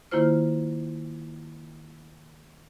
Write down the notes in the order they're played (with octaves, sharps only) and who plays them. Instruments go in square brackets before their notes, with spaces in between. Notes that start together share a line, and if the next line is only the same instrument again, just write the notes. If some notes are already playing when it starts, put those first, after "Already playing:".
[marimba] D#3 A#3 E4 F4 C5 F6